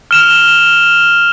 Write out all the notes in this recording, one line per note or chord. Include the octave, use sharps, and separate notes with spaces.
F6 E7 F7